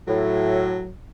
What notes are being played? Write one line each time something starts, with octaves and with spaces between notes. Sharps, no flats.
A2 F#3